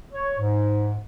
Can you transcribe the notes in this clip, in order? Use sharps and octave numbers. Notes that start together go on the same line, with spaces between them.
C#5
G#2